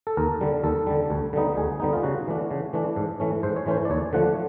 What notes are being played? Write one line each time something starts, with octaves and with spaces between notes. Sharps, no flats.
A4
D#2 A#4
D3 G3
D#2 A4
D3 G3
D2
D3 G3 B3 D#4
D2 G#4
D3 G3 B3 D#4
F4
C#3 F#4
E3 A3 D4
C#3
E3 A3 D4
G#2
E3 A3 C#4
G#2 C5
C#5
E3 A3 C#4 C5
D5
D#2 C#5
D3 F3 A3 F#5